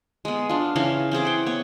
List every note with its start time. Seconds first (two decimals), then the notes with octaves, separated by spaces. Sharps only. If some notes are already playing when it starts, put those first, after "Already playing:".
0.25 G#3 B3
0.49 D4 F4
0.76 C#3 E3 C#4 F5
1.11 E3 C4 G#4 D6
1.25 F#5 G5
1.46 B3 C#5